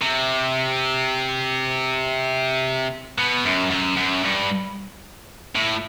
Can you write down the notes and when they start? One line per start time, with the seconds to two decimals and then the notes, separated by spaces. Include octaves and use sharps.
0.01 C3
3.19 B2
3.45 F#2
3.71 F#2
3.97 F#2
4.24 G2
5.56 A2